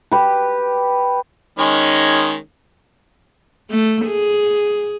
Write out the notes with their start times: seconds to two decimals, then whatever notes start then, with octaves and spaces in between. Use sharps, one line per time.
0.12 G4 B4
1.59 D#3 G#3 C#4
3.70 A3
4.06 G#4